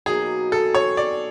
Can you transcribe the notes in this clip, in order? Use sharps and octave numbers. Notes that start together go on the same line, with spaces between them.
B2 F#3 A#3 D#4 G#4
A4
C#5
D5